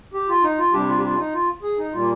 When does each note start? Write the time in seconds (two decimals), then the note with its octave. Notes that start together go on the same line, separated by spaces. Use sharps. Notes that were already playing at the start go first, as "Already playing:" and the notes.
0.14 G4
0.28 F4
0.43 D#4
0.58 F4
0.73 C3 G3 D4 G4
0.89 F4
0.99 G4
1.04 F4
1.18 D#4
1.33 F4
1.63 G#4
1.78 D#4
1.93 A#2 G3 A#3 F4